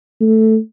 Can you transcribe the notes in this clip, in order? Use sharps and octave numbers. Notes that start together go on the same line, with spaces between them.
A3